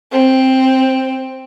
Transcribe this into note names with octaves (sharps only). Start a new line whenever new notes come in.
C4